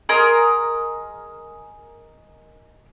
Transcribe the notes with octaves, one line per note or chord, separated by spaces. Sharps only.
G#4 A#4 D#5 C6